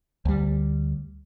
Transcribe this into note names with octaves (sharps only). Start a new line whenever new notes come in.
D2 G3